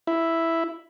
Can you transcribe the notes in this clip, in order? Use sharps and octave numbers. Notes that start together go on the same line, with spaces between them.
E4